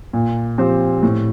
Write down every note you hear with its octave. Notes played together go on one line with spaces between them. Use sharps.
A#2
F3 C4 G4 C5
A2